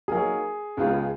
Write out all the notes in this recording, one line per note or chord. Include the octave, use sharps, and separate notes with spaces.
F#3 A#3 D#4 G#4 A#4
C#2 C#3 G#3 B3 F4